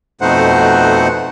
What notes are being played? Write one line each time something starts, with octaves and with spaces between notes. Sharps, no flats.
F2 B2 A3 D#4 C5 F#5